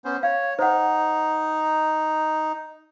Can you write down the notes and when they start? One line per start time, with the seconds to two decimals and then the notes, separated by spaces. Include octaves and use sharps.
0.05 B3 C#4 C5
0.23 C#5 F5
0.59 D#4 C5 F#5